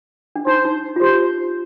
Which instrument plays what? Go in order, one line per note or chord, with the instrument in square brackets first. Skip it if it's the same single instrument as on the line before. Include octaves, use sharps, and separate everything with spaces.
[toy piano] D4
[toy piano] D#4 [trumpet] C5
[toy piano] D#4
F4
[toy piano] G4 [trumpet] C5